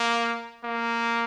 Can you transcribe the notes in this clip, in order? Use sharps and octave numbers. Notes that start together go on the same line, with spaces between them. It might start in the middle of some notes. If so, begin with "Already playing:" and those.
Already playing: A#3
A#3